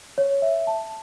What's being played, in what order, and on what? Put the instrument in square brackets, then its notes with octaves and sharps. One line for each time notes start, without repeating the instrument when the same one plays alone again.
[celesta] C#5
E5
A5